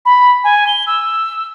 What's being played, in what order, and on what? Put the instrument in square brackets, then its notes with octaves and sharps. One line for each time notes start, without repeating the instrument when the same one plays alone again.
[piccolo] B5
G#5
G7
E6